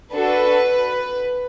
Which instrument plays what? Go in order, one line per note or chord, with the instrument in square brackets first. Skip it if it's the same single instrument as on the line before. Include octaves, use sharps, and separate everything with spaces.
[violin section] D4 F#4 A4 B4